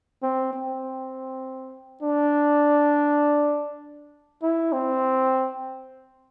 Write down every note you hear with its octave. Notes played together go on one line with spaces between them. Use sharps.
C4
C4
D4
E4
C4